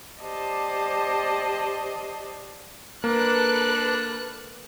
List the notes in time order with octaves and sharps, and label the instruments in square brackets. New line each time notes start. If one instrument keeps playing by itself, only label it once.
[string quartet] G4 C5 D5 D#5 A5
[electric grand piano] A#3 [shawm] D4 [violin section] A4 B4 F#6